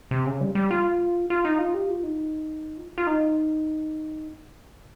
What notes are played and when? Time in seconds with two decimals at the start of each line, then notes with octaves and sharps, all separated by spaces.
0.11 C3
0.26 C#3
0.41 G3
0.55 G3
0.71 F4
1.30 F4
1.45 D#4
1.59 F4
1.74 G4
1.89 F4
2.03 D#4
2.77 F4
2.98 F4
3.07 D#4